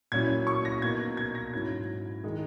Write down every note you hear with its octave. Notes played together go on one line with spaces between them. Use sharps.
A#2 F#3 C#4 E4 G#6
C#6
A#6
B2 A#3 D#4 G#6
G#6
A#6
G#2 F#3 C#4 E4 G#6
D#3 G#3 D#4